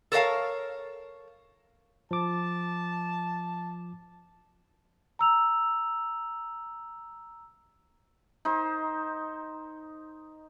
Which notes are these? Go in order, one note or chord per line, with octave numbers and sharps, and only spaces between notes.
A4 A#4 C#5 D5 F5 A5
F3 A5 D6
A#5 E6 F7
D#4 C5